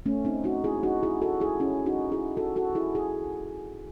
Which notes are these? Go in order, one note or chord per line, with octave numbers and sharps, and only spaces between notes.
A3 C#4
C4 D#4
D#4 F#4
E4 G#4
D#4 F#4
E4 G#4
F#4 A4
E4 G#4
C#4 E4
D#4 F#4
E4 G#4
F#4 A4
F#4 A4
E4 G#4
E4 G#4